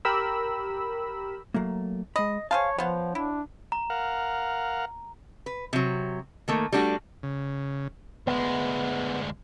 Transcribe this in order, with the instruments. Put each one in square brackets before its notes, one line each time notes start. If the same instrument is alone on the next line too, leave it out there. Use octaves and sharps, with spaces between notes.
[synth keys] G4 A#4 B5 E6
[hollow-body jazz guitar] F#3 A3 A#3
[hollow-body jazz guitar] G#3 B5 [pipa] D#5
[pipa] G#4 C5 F5 [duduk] C#5 [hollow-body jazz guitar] A5
[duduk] F3 [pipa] B3 C5 [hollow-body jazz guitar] C#5 F5 F#5
[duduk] D4 [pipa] E4
[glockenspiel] A#5
[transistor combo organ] A#4 F5 F#5
[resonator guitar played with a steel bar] B4
C3 F#3
D#3 A3 A#3
G3 A3 D4 F#4
[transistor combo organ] C#3
[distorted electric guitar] D2 G#3 [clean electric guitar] B3